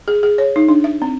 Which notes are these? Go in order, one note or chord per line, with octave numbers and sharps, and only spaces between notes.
G#4
G#4
C#5
D#4
D4
E5
C4